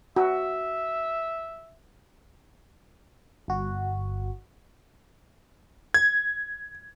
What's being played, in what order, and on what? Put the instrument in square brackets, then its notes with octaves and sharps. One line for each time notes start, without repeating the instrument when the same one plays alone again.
[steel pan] F#4 [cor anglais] E5
[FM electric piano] G1 F#4
[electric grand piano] G#6